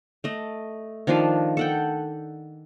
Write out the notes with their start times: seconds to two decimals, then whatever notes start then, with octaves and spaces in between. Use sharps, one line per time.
0.24 A3 D#5
1.07 D#3 F3 D4 F4
1.57 A4 F#5 G5